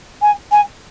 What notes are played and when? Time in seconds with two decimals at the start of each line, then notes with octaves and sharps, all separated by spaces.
0.22 G#5
0.51 G#5